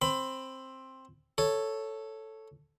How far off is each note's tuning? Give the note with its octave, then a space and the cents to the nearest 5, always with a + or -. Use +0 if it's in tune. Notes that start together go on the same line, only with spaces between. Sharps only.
C4 +10 B5 +25
A4 +0 C#5 +0